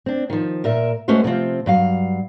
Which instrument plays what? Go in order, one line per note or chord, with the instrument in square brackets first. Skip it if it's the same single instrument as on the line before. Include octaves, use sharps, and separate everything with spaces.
[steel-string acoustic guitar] C4 D4
D#3 F3
A#2 A#4 E5
G#3 A3 C#4 F#4 B4 C5
C3 F3 C4 F4
G2 F#3 F5